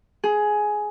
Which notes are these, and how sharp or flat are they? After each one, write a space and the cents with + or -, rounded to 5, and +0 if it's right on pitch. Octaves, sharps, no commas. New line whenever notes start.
G#4 +10